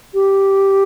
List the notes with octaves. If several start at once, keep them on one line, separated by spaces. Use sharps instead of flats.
G4